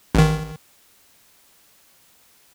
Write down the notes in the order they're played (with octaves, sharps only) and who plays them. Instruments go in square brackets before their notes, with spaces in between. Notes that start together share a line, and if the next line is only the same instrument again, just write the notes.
[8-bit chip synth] A1 D#3